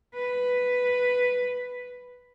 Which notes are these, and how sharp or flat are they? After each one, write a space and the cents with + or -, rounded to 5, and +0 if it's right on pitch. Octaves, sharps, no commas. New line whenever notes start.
B4 +0